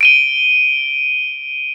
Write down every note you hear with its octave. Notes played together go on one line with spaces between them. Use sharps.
D7 D#7 G7